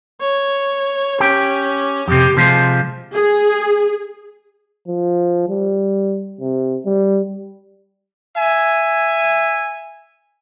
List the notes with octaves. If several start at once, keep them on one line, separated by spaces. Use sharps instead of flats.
C#5
C#4 G4
F2 C3 G4
C3 F3 G#3
G#4
F3
G3
C3
G3
E5 G#5